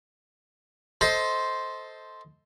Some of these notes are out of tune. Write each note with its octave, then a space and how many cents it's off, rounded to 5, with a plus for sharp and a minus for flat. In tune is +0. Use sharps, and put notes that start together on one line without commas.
A4 +0 C5 +0 D#5 +25